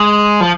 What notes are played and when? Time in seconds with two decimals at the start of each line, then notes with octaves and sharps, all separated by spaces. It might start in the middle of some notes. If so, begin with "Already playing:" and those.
Already playing: G#3
0.41 F3